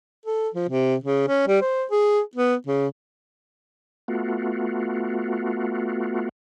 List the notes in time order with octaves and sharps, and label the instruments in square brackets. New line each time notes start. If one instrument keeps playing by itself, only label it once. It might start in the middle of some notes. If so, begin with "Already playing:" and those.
[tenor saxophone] A4
F3
C3
C#3
C#4
G3
C5
G#4
B3
C#3
[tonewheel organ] A3 B3 F4 F#4